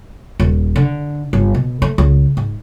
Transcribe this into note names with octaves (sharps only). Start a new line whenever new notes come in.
D#1
D3
G1
B2
A3
C#2
G#2